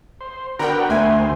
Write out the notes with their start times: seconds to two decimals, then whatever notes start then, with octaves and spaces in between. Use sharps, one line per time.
0.21 C5
0.59 D3 B3 F#4 A#4 G5
0.90 D2 A3 C5 G#5